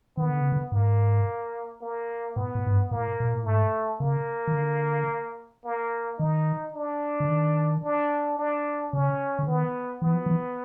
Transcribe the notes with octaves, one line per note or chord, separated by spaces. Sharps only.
D#3 B3
D3
C#3
D3
G#2 A#3
A#3
A2 B3
A2
G#2
G2
A2 A#3
A#2
A2
G#2 A3
C#3 A#3
D#3
D3
A#3
D#3 D#4
D4
D3
D#3
D4
D4
C#3 C#4
D3
D#3 B3
E3 B3
F3
E3